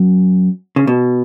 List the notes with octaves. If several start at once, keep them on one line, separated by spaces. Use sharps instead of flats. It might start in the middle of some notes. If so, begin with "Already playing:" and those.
Already playing: F#2
C#3
B2